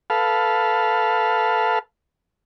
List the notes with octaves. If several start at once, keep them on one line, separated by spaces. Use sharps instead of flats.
A4 B4 F5